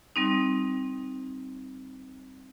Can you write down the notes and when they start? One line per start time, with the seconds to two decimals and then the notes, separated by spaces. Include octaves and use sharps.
0.16 G3 C4 D#4